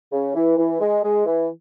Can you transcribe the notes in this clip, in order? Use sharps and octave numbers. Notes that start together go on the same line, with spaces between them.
C#3
E3
E3
G#3
G#3
E3